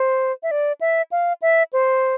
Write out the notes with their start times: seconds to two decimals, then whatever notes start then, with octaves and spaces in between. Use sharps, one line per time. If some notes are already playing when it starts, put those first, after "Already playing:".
Already playing: C5
0.43 E5
0.51 D5
0.81 E5
1.12 F5
1.42 E5
1.73 C5